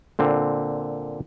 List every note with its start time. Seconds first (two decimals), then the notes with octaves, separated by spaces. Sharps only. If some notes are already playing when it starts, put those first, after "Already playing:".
0.19 A#2 D3 C4